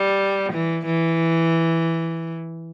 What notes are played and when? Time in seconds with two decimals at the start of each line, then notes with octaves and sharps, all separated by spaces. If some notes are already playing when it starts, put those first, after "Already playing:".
Already playing: G3
0.53 E3
0.86 E3